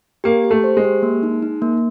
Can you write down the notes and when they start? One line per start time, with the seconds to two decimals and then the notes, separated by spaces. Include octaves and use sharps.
0.24 A#3 G4
0.44 G4
0.51 A3
0.64 C5
0.77 G#3
0.84 G4
1.03 A#3
1.23 D#4
1.42 D#4
1.62 A#3